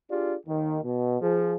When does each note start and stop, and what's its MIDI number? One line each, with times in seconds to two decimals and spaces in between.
0.11 0.35 62
0.11 0.35 65
0.11 0.35 67
0.11 0.35 68
0.11 0.35 74
0.46 0.79 39
0.46 0.79 51
0.83 1.21 47
1.21 1.56 53
1.21 1.56 68